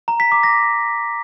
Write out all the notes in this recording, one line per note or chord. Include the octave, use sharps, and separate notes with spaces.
A#5
B6
D6
A#6